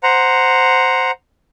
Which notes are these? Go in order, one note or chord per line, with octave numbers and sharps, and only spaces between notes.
C5 F#5 A#5